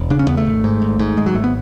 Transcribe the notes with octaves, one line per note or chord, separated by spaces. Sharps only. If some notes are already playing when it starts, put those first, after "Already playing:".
Already playing: E1
C#3 D4
C#4
E2 B3
A3
G#1
G#2
G#1
G#2
G#1 G#3
F#3
G#1 A3
B3